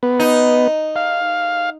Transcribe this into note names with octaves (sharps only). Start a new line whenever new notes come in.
B3
D#4
F5